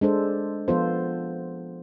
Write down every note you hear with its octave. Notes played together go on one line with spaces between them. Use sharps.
G#3 D4 A4 C5
F3 B3 F4 A4 C5